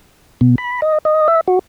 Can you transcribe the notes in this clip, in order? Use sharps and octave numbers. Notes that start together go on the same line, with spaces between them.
B2
B5
D#5
D#5
E5
F#4